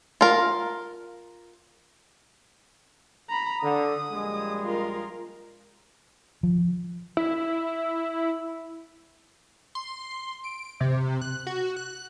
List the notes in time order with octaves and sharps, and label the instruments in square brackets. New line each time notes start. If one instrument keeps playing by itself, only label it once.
[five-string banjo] F4 A#4
[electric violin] A#5 B5
[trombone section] D3 [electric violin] D#6
[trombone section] A#1 G3 G#3
[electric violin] F4 A#4
[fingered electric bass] F3
[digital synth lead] E4
C6
D7
C3
F#6
F#4
F#6